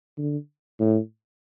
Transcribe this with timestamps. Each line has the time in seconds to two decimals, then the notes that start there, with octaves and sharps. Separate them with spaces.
0.18 D3
0.80 A2